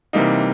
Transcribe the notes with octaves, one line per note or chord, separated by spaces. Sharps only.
C3 E3 G3 A#3 D#4